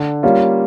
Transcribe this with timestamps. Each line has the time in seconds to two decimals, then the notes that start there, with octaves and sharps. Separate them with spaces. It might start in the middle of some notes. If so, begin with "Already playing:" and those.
Already playing: D3
0.23 G3 A#3 C#4 F4